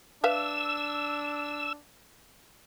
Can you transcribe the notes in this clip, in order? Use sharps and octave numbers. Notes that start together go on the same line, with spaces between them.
D4 B4 E5 F5 E6